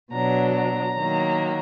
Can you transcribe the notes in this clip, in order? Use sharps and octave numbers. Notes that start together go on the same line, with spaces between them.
B2 F#3 D4 A#5
A#5
D#3 F#3 A#3